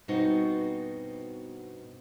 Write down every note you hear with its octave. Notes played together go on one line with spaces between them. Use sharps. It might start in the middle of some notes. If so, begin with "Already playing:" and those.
G2 B2 B3 C4 D#4 F#4